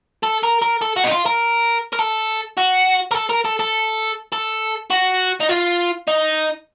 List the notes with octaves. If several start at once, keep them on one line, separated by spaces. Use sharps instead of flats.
A4
A#4
A#4
A4
F#4
D#4
F4
A#4
A#4
A4
F#4
A#4
A4
A#4
A4
A4
A4
F#4
D#4
F4
D#4